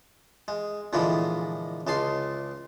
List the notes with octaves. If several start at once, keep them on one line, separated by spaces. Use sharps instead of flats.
G#3
A#2 D3 E3 F3 G#3
C#2 G#3 A5 C6